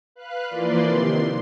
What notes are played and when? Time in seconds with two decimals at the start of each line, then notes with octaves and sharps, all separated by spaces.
0.15 B4 F5 F#6
0.49 E3 F3 A#3 B4 D5 C6
0.87 C3 D#3 C6